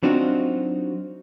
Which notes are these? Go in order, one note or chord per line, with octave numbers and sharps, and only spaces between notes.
F#3 C4 D4 D#4 F4 F#4